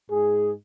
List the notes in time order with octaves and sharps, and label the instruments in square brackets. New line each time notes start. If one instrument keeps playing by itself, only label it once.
[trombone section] G#2 G#3 G#4